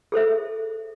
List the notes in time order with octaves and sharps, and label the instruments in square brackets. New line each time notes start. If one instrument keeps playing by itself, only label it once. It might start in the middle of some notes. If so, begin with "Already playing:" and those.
[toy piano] G#4 A4 C5 E5